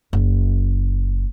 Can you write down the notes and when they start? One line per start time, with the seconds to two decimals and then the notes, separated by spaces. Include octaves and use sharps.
0.13 F#1